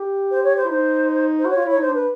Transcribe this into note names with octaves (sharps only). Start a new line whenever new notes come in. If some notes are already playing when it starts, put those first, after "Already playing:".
Already playing: G4
C5
C#5
C5
E4
D#4 C5
C5
F#4 C#5
F4
E4 C#5
D#4 C5
D4
B4